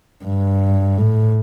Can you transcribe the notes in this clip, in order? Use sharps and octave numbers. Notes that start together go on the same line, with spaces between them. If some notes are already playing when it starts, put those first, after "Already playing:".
G2
A2